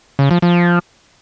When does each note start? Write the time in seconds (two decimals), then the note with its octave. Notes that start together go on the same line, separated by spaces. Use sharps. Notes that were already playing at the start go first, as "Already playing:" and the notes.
0.19 C#3
0.31 F3
0.42 F3